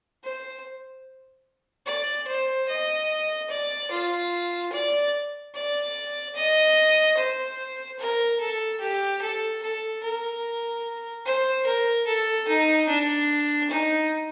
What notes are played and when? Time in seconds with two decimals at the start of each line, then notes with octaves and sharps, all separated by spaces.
0.24 C5
1.86 D5
2.27 C5
2.68 D#5
3.50 D5
3.91 F4
4.72 D5
5.54 D5
6.35 D#5
7.17 C5
7.99 A#4
8.40 A4
8.80 G4
9.22 A4
9.63 A4
10.03 A#4
11.25 C5
11.66 A#4
12.07 A4
12.48 D#4
12.88 D4
13.70 D#4